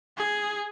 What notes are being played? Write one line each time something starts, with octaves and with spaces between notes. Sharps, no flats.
G#4